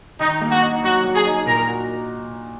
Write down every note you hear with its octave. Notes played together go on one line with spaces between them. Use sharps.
D#3 D#4
A#3
F#4
D#4
F#3 F#4
F#3
G#4
D#4
A#2 A#4
F#4